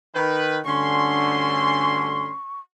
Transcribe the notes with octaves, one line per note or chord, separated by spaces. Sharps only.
D#3 B4
D2 G2 D3 C#4 C6 C#6